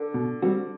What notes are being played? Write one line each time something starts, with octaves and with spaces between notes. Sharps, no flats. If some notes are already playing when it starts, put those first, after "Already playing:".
Already playing: D3
B2
G3 C4 F#4